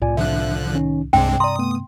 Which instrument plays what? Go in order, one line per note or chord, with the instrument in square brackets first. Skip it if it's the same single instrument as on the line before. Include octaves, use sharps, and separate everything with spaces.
[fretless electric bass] C2 A2 C3 [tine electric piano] F4 D5 G#5
[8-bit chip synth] D3 F3 F#6 [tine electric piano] D4 E5
[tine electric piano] D#3 C#4 D#4
[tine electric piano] C2 [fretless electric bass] G2 C3 [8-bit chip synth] G#3 C4 D4 [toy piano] G5
[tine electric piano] D5 A#5 [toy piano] C6 [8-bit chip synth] D#6
[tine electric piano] A3 B3